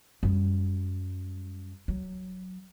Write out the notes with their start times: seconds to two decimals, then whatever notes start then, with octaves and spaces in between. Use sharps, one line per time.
0.23 F#2 G3
1.88 F#3